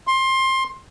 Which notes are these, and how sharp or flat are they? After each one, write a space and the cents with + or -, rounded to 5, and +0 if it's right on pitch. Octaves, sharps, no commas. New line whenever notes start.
C6 +20